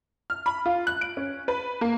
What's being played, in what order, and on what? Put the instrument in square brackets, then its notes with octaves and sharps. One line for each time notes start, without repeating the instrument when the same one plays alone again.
[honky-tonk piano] F6
B5
F4
F#6
D7
C#4
B4
A#3